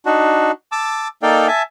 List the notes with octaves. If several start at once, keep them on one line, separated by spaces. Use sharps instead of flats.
D4 D#4 F#4
A5 D6 E6
A#3 D#4 A4 D5 F5 G5
E5 G#5 A5